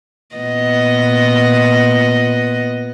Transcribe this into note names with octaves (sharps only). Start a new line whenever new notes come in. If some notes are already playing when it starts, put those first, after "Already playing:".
A#2 B3 D#5